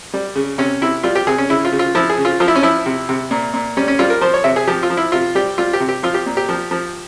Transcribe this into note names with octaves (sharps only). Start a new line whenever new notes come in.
G3
C#3
C3 C#4
C3 E4
G3 F4
G4
C3 G#4
C#4
C#3 E4
F4
C#3
F4
F3 E4
G#4
C#3
F4
F3 F4
E4
C#4
F3 E4
C3
C3
A#2
A#2
G3 C#4
C#4
G3 F4
A#4
F3 C5
C#5
C3 E5
G#4
F3 G4
F4
F3
E4
C3 F4
G3 G4
G3 F4
G4
C3
G4
F3 F4
G4
A#2
G4
F3
F3